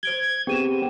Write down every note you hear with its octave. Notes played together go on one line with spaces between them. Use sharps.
C5 G#6 D7 G7
B3 C4 G4 G#4 D#7 E7